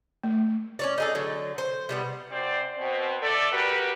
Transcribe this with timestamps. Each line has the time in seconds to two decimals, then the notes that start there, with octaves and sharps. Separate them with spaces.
0.24 A3
0.79 C#4 C#5 D5
0.98 D#4 G#4 A4
1.15 D3 F#3
1.58 C5
1.89 C3 G3 B3
2.31 F#2 C4 C5 D5
2.79 B2 C4
3.22 A3 A4 D5
3.53 G3 F#4 G4 A#4 B4